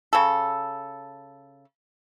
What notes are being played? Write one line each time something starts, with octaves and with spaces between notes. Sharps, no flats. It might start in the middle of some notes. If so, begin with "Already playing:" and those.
C#3 A4